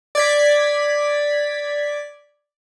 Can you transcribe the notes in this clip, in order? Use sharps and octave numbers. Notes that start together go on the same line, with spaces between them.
D5 G#6 B6